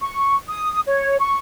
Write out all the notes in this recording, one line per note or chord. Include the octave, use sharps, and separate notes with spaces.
C#6
D#6
C#5
C#6